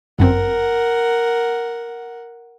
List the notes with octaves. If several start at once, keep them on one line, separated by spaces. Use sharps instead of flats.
G1 F#2 C4 A#4 F#5